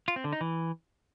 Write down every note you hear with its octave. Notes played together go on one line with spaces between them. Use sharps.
F4
C4
D3
D#4
E3